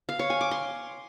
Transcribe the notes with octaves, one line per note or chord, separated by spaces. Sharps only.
F5
C#5
G#5
D6
C6